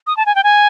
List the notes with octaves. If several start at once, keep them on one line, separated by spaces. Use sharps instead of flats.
D#6
A5
G#5
G5
G#5